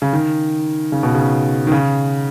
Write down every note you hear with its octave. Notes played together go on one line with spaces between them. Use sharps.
C#3
D#3
C#3
B2
C#3
D#3
C#3